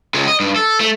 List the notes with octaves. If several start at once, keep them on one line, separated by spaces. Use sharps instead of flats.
C#2 G#3
D#5
G2
A4
A3